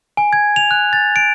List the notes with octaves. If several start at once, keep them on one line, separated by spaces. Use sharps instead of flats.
G#5
G#6
F7
F#6
A6
D7